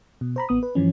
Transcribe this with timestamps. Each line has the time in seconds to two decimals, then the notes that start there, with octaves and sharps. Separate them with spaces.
0.21 B2
0.36 C5 A#5 B5
0.49 A1 B3 D#6
0.63 B4
0.75 G2 E3 F3 C#4